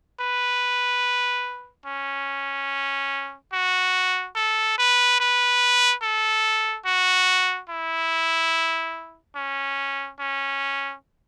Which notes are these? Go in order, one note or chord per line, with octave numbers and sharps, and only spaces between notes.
B4
C#4
F#4
A4
B4
B4
A4
F#4
E4
C#4
C#4